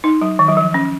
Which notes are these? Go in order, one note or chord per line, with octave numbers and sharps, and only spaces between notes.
D#4
F#3
D#3
F#3
F3
C#4